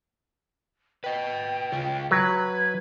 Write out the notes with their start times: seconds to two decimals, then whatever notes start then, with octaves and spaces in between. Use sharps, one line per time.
1.04 B4 D#5 G5
1.72 C#3 F4
2.11 F#3 B4 G#6